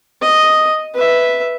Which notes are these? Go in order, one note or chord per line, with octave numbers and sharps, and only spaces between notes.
D#5
B4 E5